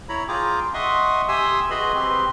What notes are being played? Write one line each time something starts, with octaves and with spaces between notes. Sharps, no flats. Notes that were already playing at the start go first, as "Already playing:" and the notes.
E4 C#5 A#5 B5
F4 G#4 G5 A#5 D6
D#5 E5 F#5 C6 C#6 D#6
G4 E5 G#5 C6 D#6 E6
F#4 G#4 B4 D#5 B5 C6
C4 G4 B4 C6